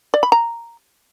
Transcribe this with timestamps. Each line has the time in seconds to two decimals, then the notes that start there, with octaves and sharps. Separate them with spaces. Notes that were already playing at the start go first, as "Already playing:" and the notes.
0.14 D5
0.23 B5
0.32 A#5